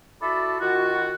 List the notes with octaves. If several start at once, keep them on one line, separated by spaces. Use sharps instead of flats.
E4 F#4 A4 D5 B5
D#3 F4 F#4